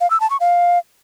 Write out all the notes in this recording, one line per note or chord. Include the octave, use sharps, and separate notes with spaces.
F5
E6
A5
C#6
F5